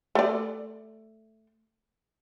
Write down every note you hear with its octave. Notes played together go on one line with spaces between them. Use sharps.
A3 D5